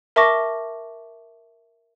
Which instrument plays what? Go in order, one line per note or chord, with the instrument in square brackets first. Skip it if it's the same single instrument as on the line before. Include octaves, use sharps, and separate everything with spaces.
[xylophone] A#4 E5 A5 C#6 D6 A#6